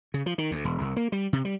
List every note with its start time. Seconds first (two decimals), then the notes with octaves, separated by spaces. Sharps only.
0.14 C#3
0.26 F3
0.38 D#3
0.51 D2
0.65 E1
0.81 C2
0.96 A#3
1.12 G3
1.33 C3
1.45 G3